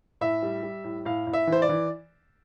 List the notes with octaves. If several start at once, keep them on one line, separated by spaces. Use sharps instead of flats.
A2 E5
G3
G3
A2
A2 F5
A2
E5
E3
C5
D5
E3